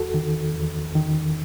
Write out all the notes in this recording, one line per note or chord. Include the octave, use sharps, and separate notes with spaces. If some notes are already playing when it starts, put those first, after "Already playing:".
Already playing: E2 F#4 A4
D#3
E2
D#3